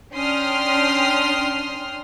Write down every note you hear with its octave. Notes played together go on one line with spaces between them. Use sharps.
C#4 D4 G5 C6 D#6 F6